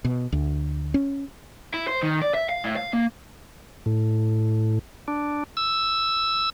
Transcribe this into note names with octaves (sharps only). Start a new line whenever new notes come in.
B2
D2
C#4
E4
C5
D#3
D5
E5
F5
A2
F5
A#3
A2
D4
E6